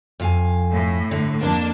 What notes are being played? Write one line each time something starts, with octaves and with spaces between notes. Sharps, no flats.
F2 F5 G#5
A2
D3
F2 A#3 D4